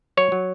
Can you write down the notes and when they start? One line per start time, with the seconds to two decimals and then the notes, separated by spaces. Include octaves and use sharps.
0.17 F#3 C#5
0.32 F#3